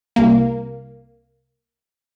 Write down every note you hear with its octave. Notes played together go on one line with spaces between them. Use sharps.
C2 A#3